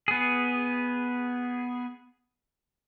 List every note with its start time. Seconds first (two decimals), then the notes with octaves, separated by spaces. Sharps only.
0.08 B3 G#4